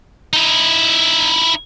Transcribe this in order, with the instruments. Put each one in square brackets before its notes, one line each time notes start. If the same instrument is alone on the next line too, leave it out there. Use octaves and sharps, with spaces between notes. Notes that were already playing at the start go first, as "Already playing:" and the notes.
[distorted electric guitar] D#4 E4